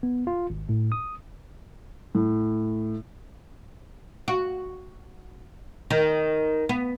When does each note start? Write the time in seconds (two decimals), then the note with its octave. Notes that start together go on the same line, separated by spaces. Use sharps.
0.03 B3
0.27 F4
0.50 G#1
0.69 A2
0.92 D#6
2.15 A2
4.28 F#4
5.90 D#3
6.69 B3